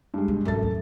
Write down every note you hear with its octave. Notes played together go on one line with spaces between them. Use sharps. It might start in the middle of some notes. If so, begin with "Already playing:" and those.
G2 G#3
B2
G#1 F#2 B2 A3 A6
D#2